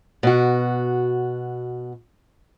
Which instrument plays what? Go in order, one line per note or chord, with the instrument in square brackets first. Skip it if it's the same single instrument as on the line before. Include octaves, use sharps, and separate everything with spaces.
[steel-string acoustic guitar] B2 F#4